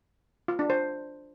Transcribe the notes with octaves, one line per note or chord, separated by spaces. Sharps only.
F4
D4
C5